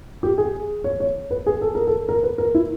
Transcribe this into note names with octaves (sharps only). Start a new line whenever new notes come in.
G4
G#4
C#5
C#5
B4
G#4
A4
A#4
A4
A#4
B4
A#4
E4